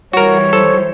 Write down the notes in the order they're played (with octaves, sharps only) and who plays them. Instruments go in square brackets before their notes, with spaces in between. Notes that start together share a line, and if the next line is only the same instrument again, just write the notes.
[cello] E3 G3 [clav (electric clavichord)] F#4 A#4 [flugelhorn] C#5
[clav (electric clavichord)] A4 [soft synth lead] C5